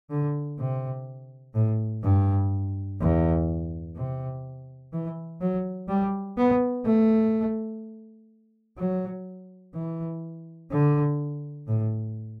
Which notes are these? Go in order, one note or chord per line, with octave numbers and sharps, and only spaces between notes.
D3
C3
A2
G2
E2
C3
E3
F#3
G3
B3
A3
F#3
E3
D3
A2